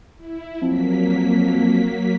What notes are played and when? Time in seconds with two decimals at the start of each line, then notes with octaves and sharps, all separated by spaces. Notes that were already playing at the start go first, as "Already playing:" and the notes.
0.18 E4
0.62 F2 F#3 A#3 B6